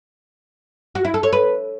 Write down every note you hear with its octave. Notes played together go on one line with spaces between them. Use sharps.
F#4
E4
A4
C#5
B4